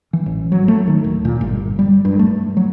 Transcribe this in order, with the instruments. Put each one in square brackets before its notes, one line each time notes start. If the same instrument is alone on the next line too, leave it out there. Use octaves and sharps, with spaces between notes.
[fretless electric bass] E3
A1
F#3
A3
D#3
D1
A#2
G1
G3
G2
A3
F#3